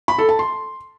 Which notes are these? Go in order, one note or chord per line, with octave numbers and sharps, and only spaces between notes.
B5
A4
A5
C6